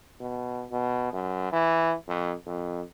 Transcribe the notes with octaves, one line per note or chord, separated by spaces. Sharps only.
B2
B2
F#2
E3
F2
F2